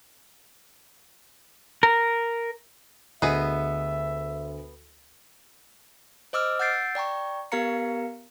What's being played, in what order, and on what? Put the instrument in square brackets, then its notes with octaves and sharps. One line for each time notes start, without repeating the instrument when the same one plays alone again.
[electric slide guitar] A#4
[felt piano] D2 [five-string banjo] B3 G#4 D#5 [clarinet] E5
[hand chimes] C5 D#5 D6 E6 F6
F#5 E6 G6 A6 C7 D7
D5 G5 A#5 C#6
B3 G4 A#4 F5 A#5 C#7